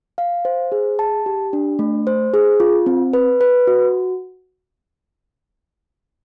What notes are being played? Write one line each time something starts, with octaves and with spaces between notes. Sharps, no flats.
F5
C5
G#4
A5
G4
D4
A3
C5
G#4
F4
C4
B4
B4
F#4